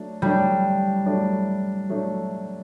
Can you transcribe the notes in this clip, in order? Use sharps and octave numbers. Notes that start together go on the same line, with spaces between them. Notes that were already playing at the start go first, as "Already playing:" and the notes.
Already playing: F#3 A3 D4
F#3 G3 A3 D4
F#3 A3 D4
F#3 A3 D4